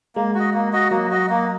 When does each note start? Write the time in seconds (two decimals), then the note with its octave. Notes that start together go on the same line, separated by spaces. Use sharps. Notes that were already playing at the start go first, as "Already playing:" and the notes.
0.16 G#3 A#3
0.35 F#4 D#5
0.54 A#3
0.73 F#4 D#5
0.91 F#3 A#3
1.11 F#4 D#5
1.30 A#3